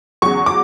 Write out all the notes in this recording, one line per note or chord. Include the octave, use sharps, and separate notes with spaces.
E2 C#3 F#3 C#6
D6